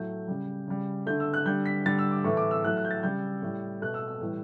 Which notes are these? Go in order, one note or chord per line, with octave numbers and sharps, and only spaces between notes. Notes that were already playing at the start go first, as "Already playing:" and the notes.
Already playing: A2 F#3 A3 G6
C#3 G3
C#3 G3
D3 A3 G6
E6
F#6
D3 G3 G6
B6
D3 G3 A6
E6
D6
A2 E3 A3 C#6
D6
E6
A2 F#3 A3 F#6
F#6
G6
A6
C#3 G3 G6
A2 G3
B2 A3 F#6
E6
E6
A2 E3 G3